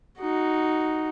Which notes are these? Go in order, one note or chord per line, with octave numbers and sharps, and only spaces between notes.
D#4 F#4